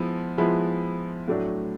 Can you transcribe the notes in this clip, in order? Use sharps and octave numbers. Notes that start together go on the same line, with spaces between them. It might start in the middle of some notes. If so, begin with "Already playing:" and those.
Already playing: F3 G#3 B3 E4
F3 G#3 B3 E4
A2 F#3 A3 D4